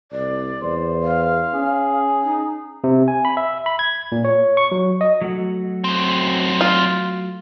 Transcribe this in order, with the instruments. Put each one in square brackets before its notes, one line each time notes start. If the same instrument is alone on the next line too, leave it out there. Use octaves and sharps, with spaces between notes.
[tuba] C2 [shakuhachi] D5
[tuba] E2 [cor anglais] C5
[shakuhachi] F5
[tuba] C#4 [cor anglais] G#4
[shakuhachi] D#4
[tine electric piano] C3
G#5
B5
E5
B5
G#6
A#2
C#5
C#6
F#3
D#5
[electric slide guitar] F#3 A3 F#4
[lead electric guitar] F#2 C4
[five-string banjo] F4